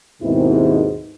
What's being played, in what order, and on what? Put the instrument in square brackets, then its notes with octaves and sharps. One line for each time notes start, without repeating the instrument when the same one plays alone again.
[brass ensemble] D#2 G#2 B2 [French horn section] D#3 C4 E4